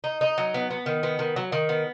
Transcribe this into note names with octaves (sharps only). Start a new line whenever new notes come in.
D#4
D#4
F#3
B3
B3
D#3
B3
D#3
F#3
D#3
B3